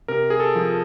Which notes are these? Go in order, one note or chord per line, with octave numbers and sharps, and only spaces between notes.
C3 A#4
G#4
A4
F3